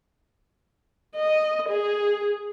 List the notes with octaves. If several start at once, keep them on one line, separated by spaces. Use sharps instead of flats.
D#5
G#4